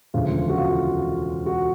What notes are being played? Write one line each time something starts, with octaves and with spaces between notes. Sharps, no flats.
E1 D2 C#3 F3 F4
F#4
F4
F#4